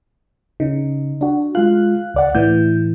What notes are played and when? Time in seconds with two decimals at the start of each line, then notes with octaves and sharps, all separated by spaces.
0.60 C#3 D#4
1.21 D4 F#4
1.55 G#3 F4 F5 F#6
2.14 C#2 D5 F#5
2.35 A2 E3 G6